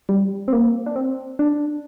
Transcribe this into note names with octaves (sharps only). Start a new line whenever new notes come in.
G3
C4
A#3
D4
C4
D4